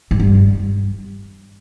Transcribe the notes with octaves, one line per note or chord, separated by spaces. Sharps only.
G#2
G2